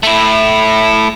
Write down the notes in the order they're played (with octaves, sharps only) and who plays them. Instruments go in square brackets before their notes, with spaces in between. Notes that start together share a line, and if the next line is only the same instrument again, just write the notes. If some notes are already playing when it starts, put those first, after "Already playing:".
[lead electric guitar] A3 E4